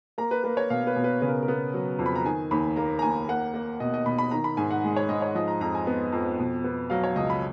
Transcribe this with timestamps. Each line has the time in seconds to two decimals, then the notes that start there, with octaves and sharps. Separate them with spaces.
0.18 A#3 A#5
0.31 B4
0.44 A#3 B4
0.57 C#5
0.70 B2 F5
0.87 B4
0.96 B2
1.04 B4
1.22 C#3 B4
1.28 A#4
1.43 A#4
1.48 B3
1.74 F#3
1.99 F2
2.06 B5
2.16 A#5
2.25 D#3 G#5
2.51 D#2 B5
2.76 A#3 A#5
2.99 A#5
3.02 D#2 G#5
3.28 A#3 F#5
3.54 A#3
3.80 B2 D#5
3.94 D#5
4.06 B2 B5
4.18 B5
4.31 D#3 A#5
4.44 B5
4.57 G#2 G#5
4.71 F#5
4.84 G#3
4.96 C#5
5.09 G#2 D#5
5.22 C#5
5.35 F3 D#5
5.48 A#5
5.61 F2 A#5
5.75 G#5
5.87 B3
6.12 F2
6.39 B2
6.64 B3
6.90 F#3 F5
7.04 C#5
7.16 C#2 D#5
7.30 B5